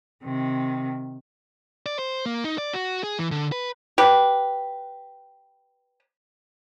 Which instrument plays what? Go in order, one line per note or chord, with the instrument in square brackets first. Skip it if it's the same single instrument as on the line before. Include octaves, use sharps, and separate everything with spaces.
[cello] C3 D#3
[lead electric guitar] D5
C5
A#3
D#4
D5
F#4
G#4
E3
D3
B4
[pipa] G4 B4